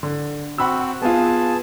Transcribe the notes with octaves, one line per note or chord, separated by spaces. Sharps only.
D3
C4 F#4 F#5 B5 E6
B3 F4 G#4 A5